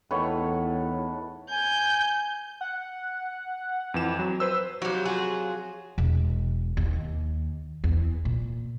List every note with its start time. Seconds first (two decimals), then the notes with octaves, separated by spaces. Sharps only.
0.11 E2 A2 D#3 A4 B4 C#5 F#5
1.51 G#5 G6
2.61 F#5
3.94 F2 E3 E7
4.19 F#3
4.40 B4 C5 E6
4.82 F2 F#3 F#4 G4
5.05 F4 F#4 G#4
5.98 E1
6.77 D#2
7.84 E2
8.25 A#2